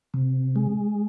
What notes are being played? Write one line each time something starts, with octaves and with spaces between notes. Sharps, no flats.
C3
G#3